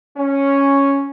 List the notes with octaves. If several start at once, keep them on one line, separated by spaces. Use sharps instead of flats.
C#4